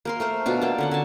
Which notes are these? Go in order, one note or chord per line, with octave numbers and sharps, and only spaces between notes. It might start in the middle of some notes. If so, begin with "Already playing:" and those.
A#3 A#4 C6
A3 A#4 C5
B2 D4 F4
A#3 G5 A5
D3 C#4 F#5
D3 G#5 A5